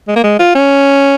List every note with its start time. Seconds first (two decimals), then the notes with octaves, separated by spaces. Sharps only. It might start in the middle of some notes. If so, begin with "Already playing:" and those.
0.08 G#3
0.16 A#3
0.24 G#3
0.39 F4
0.55 C#4